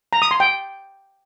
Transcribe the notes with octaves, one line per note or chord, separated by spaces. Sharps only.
A#5
D#6
C6
G5